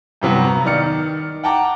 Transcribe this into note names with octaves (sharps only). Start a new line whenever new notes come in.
G2 C3 F#3 B3
A#5
D#3 D5 F6 C#7
F#5 G5 A5 A#5 D6